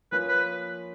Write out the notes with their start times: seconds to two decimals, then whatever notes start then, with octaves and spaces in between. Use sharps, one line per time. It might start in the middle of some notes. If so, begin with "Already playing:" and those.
0.12 F3 A#3 C#4 F4 B4
0.29 B4